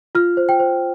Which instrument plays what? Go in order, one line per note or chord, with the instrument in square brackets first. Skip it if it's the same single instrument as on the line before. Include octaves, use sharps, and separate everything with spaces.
[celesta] F4 F6
C5
G5
C5